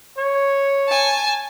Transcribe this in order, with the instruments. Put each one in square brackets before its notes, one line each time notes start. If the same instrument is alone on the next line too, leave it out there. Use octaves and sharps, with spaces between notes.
[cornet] C#5
[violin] G#5 A5